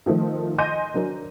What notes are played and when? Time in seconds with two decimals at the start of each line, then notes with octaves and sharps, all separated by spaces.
0.06 D#3 F3 A3
0.58 D#5 G#5 C6 G6 A#6 D#7
0.94 F#3 D4 A#4